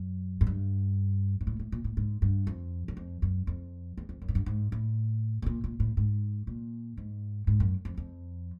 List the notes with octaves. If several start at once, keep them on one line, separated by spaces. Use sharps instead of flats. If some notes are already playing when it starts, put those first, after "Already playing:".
Already playing: F#2
G#2
G2
G#2
A2
A2
A#2
A2
G#2
G2
F2
F#2
F2
F#2
F2
E2
F2
F#2
G#2
G2
G#2
A2
B2
A#2
A#2
A2
G#2
A#2
G#2
G#2
F#2
F2
F2